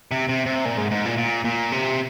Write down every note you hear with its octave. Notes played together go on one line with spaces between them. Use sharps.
C3
C3
C3
A#2
G#2
G#2
A#2
A#2
A#2
C3